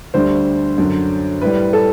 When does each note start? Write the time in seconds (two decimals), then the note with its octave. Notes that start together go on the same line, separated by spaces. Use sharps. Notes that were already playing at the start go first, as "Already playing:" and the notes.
0.14 D2 D3 G3 C5
0.78 F#2 D3 F#3
1.42 A2 G3 B4
1.73 A4